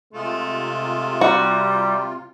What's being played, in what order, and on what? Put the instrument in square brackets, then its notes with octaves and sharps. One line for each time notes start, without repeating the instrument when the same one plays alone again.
[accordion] C3 F4 [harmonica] G#3 A3
[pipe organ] G3 [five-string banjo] F#4 [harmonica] G4 A#5